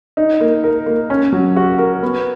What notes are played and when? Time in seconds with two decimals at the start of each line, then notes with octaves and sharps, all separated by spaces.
0.17 D#4
0.41 A#3
0.64 A#4
0.86 A#3
1.10 C#4
1.32 F#3
1.56 F#4
1.78 A#4
2.03 B3